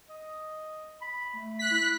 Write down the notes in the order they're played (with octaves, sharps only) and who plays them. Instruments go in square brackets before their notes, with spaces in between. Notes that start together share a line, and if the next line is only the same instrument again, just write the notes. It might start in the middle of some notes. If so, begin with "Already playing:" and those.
[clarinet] D#5
B5
A3
[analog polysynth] F#6 B6
[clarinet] E4